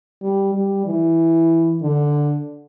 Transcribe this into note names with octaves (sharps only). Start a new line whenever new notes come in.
G3
G3
E3
D3